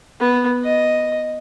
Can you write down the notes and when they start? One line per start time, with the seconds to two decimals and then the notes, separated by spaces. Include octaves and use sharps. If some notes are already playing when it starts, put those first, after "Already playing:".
0.20 B3
0.64 D#5